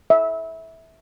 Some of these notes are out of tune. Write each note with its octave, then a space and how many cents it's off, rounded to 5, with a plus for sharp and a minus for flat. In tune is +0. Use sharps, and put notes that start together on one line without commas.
E5 -20